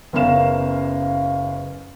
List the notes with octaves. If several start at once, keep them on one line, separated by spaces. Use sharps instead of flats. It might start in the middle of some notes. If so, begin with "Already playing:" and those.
F#1 B3 C#4 A#4 F5 E7